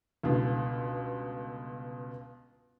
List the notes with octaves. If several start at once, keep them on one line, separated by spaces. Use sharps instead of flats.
C#2 G2 B2 D3